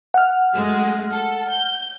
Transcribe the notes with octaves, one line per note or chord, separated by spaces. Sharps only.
F#5 F6
F#2 G#3 A3
A4
G6